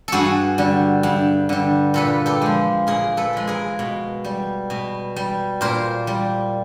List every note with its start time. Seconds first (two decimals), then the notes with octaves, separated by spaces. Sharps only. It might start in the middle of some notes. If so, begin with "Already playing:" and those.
0.08 G2 F#4 G#4 A4
0.58 D3 G3
1.03 G2
1.49 D3 G3
1.94 A#2 A4 B4
2.26 G4 A4
2.42 F3 G#3
2.87 A#2 G#4 A#4
3.17 A4 B4
3.33 F3 G#3
3.47 G#4 A#4
3.79 B2
4.24 G3
4.70 B2
5.16 G3
5.61 A#2 A#4 C5
6.07 G3